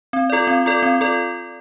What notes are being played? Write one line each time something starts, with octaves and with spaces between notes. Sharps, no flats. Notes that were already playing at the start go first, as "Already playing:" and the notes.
C4
F4 A4 D5
C4
F4 A4 D5
C4
F4 A4 D5